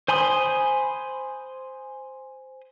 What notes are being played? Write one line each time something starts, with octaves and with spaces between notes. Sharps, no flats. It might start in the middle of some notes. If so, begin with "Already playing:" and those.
C5 G#5 B5 C6 D#6